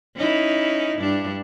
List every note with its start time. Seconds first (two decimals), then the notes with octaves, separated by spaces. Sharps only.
0.16 C#4 D#4 E4
0.98 G2 D4